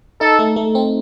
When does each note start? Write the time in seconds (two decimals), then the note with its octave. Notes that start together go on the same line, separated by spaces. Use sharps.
0.20 D#4 A4
0.39 A3
0.56 A3
0.75 C4